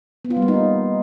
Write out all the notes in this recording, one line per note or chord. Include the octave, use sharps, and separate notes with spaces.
B3
F4
G3
A#3
D#4